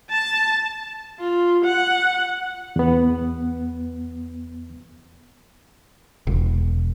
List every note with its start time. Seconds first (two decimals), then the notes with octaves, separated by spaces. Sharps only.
0.12 A5
1.20 F4
1.65 F#5
2.76 E2 B3
6.27 E1